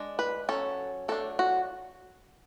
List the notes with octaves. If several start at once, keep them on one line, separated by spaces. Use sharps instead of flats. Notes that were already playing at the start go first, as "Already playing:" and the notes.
Already playing: G#3 D4
B4
F#3 C#4 A4
F#3 A3 D4 A4
F#4